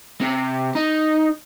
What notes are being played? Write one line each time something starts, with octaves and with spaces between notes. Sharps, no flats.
C3
D#4